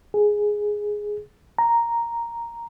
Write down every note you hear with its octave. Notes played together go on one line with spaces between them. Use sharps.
G#4
A#5